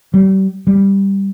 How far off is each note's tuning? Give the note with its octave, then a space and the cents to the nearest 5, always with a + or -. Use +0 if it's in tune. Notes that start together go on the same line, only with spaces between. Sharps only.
G3 -35
G3 +5